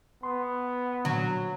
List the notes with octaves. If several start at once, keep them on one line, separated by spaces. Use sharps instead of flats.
B3 C6
A#2 D3 F#3